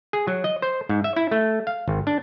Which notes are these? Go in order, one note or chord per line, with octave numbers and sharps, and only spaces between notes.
G#4
F#3
D#5
C5
G#2
E5
E4
A3
F5
G#1
D4